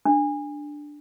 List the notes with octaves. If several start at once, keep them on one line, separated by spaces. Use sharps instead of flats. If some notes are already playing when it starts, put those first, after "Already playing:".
D4